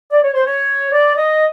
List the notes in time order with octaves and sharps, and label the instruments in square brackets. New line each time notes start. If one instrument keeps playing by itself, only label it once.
[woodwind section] D5
C#5
C5
C#5
D5
D#5